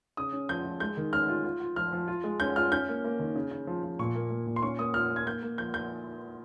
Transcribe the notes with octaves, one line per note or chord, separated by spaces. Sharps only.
C#3 D#6
C#4
F3 G6
F3
G#3 G6
D#3
C#4 F6
F4
F4
F4
F3 F6
F3
F4
G#3
C#4 G6
F4 F6
C#4 G6
A#3
A#3
D#3
C#3
C#3
F3
F3
A#2 C#6
A#3
A#3
A#2
C6
C#4 C#6
A#3 D#6
F4 F6
A#3
G#6
A#3 G6
A#3
F3 G6
F3 G6